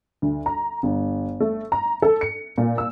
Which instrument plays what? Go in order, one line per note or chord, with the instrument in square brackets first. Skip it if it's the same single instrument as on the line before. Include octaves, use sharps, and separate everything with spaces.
[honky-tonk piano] D2
A#5
G1
A3
A#5
A4
C#7
A#2
E6